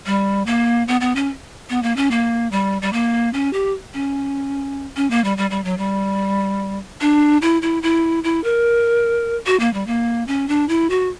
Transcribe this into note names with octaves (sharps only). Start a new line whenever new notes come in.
G3
A#3
B3
B3
C#4
B3
A#3
C#4
A#3
G3
G3
A#3
C#4
G4
C#4
C#4
A#3
G3
G3
G3
F#3
G3
D4
E4
E4
E4
E4
A#4
F#4
A#3
G3
A#3
C#4
D4
E4
F#4